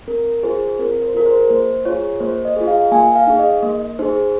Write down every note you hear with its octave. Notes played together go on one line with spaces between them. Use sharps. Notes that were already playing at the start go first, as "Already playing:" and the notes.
C4 A#4
F4 G#4 C5
C4 A#4
C5
F4 G#4 A#4
C5
A#3 C5
F4 G#4 C#5
A#3 C5
D#5
F4 G#4
F5
A#3 G#5
F5
D#4 G#4
D#5
A#3
D#4 G#4 C5